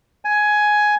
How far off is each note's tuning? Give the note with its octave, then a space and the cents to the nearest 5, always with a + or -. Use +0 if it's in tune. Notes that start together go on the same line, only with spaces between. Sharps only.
G#5 +10